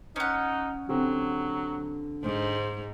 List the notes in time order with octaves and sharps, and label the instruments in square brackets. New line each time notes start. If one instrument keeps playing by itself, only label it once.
[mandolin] C#4 F#5 [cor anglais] D#4
[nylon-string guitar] D3 C4 G4 [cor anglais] F#3
[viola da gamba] G#2 [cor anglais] C5